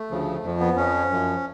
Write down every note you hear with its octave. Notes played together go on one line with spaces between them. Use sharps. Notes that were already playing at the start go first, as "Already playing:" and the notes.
Already playing: A3
D2 C#3 F3
F2 F3
B3
F2 F3 C#4
F#2 F3